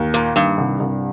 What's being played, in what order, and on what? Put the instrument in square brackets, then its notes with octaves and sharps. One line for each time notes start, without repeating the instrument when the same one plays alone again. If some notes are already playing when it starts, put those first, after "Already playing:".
Already playing: [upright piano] D#2
[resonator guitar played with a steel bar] A#2 [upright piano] A#3
[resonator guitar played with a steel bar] G2 [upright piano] D#3
[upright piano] C2
C2